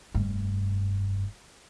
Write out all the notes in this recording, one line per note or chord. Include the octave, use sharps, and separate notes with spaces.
F1 G2